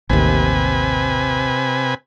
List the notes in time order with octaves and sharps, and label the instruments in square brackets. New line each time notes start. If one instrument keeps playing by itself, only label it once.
[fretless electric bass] A1 D#2 [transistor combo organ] C3 B4 G#5